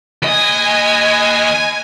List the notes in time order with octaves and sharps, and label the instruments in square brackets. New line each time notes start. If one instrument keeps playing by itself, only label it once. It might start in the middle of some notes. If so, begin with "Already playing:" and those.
[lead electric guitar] D#2 D#5 [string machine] G#5